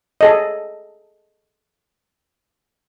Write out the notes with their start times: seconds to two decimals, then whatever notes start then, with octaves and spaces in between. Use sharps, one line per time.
0.21 G#4 A4 D#5